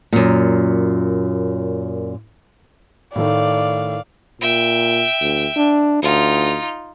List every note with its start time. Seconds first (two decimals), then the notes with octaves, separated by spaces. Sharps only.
0.13 F#2 A#2
3.16 A2 D#3 A3 D5 F5
4.41 A#2 E5 G5
5.21 D2
5.56 D4
6.02 D2 D#4 F4